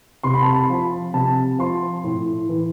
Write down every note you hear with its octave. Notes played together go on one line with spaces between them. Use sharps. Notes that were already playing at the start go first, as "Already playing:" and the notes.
C3 C6
B5
A5
B5
F3
C3 A5
F3 C6
A2
E3